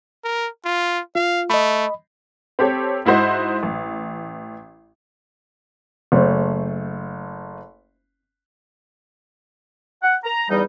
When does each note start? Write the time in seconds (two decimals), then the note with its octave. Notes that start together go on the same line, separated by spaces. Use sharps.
0.24 A#4
0.65 F4
1.15 F4 F5
1.50 A3 D#5 B5
2.59 C4 G4 A4 C#5
3.05 G#2 E4 F#4 C5 D#5
3.63 A1
6.12 F#1 A3 C5
10.03 F#5
10.24 A#5
10.50 E2 G3 D#4